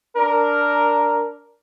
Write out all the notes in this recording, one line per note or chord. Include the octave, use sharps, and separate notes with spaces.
D4 A#4